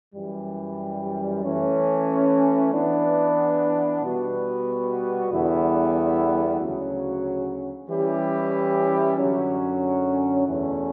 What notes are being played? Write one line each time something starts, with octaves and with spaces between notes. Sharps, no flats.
F#2 E3 G3
E3 A3 C#4
E3 B3 D4
B2 G3 B3 F#4 B4
E2 D3 G3 B3 E4
D2 C#3 F#3 C#4 F#4
E3 G3 C#4 E4 G4
F#2 D3 F#3 C#4
E2 B2 A3 C#4 E4